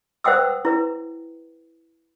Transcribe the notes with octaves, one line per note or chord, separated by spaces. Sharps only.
B4 C5 F#5 G5 D#6 E6
E4 B4